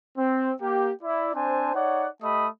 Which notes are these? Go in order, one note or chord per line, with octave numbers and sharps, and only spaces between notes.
C4
A#3 G4
E4 D5
C4 D4 C5 G#5 A5
D#4 C#5 D5 F#5
A3 G4 D#5 B5 D#6